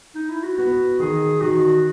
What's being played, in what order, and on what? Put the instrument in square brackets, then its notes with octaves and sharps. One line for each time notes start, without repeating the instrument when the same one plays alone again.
[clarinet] D#4
E4
F#4
[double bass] B3 [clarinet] F#4
[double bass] D#3 [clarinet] G#4
[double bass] D#3 [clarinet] F#4